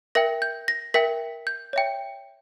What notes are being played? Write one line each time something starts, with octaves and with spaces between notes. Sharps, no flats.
A#4 E5 G5 A#6
G6
A#6
A#4 E5 G5 B6
G6
C#5 E5 G5